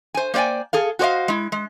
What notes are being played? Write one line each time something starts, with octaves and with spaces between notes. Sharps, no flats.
C5 G#5
A#3 C5 D5 G5 G#5
G#4 A4 F5
F#4 G4 C5 D5 D#5 F5
G#3 E4
G#3